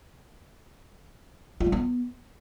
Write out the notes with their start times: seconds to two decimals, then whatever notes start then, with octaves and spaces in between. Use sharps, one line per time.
1.60 F4
1.66 G3
1.72 B3